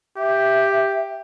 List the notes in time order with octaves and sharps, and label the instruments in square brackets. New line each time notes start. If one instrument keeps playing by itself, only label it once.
[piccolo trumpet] G4 [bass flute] E5